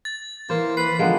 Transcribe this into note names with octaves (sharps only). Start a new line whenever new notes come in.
A6
E3 A#3 C5
B4 C7
D3 F3 G#3 A#3 B3